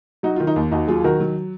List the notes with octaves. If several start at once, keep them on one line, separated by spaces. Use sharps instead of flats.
F#3 D#4 F#4
D#3 F4
D#4
D#2
D#2 D#4 F#4
F#3 F4 G#4
D#3 F#4 A#4
F#3